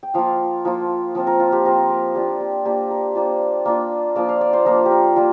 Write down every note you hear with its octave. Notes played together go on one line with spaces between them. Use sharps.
G5
F3 A#3 F4 F5
F3 A#3 F4
F3 C4 F4
A#4
F4
G4
F3 C4 F4 A#4
A#4
A#3 D4 F4 G4
G4
A#3 D4 F4 G4
A#4
A#3 D4 F4 C5
A#3 D4 F4
F3 A#3 D4 D5
F5
D5
C5
F3 A#3 D4 A#4
G4
A#4
G3 A#3 F4